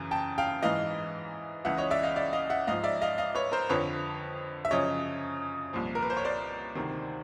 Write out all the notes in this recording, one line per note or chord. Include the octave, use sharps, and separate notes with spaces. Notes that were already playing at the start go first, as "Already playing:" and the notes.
Already playing: F#2 C#3 E3
G5 A5
F5 G5
G#2 E3 D#5 F5
C#2 C#3 E3 E5 F#5
C#5 D#5
D5 E5
D#5 F5
D5 E5
D#5 F5
E5 F#5
G#2 F3 D#5 F5
D5 E5
D#5 F5
D#5 F5
B4 C#5
A#4 C5
F2 D3 F3 B4 C#5
E5
F#2 C#3 F3 C#5 D#5
C2 A#2 F3
A#4
B4
C5
C#5
C5 D5
D2 C3 D#3